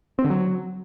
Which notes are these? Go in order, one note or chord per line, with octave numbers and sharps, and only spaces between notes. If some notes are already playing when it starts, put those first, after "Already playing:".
C4
D3
F#3